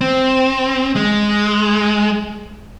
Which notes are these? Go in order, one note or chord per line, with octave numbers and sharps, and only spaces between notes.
C4
G#3